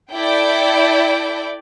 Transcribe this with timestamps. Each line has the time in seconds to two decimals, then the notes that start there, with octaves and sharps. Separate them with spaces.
0.13 E4 A4 D5 G5